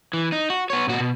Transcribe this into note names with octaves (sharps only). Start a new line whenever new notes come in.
E3
D#4
F#4
B3 C#5
A#2 F#4
B2